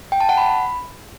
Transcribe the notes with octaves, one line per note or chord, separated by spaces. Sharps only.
G5
A5
F#5
B5